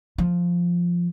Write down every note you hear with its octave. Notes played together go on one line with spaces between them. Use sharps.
F3